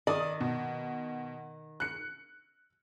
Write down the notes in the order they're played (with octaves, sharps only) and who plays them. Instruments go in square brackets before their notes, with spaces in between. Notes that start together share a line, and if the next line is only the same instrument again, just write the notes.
[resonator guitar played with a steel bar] D#3 [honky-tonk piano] D5 D#6
[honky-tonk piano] B2
F#6 C#7